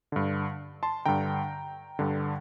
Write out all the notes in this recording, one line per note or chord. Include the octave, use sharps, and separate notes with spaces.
G2 D3
A5 C6
G2 D3 G5 A#5
G2 D3